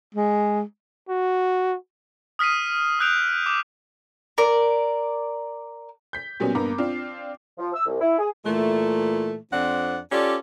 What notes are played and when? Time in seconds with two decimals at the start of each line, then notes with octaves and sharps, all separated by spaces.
0.15 G#3
1.09 F#4
2.39 D#6 F6 B6 C7 D#7
2.99 D#6 E6 F#6 G6 D7 F7
3.46 D6
4.38 A#4 D5
6.13 G6 B6
6.40 A#2 F#3 G3 B3 C#4
6.55 G2 A#3 B3 A#5 D6
6.78 C4 D4 F4
7.58 F3
7.74 E6
7.86 C2
8.01 E4
8.18 G#4
8.44 A#2 E3 A3
9.51 F2 F3 C4 D4 D5 F#5
10.11 C#4 F4 G4 A4 D5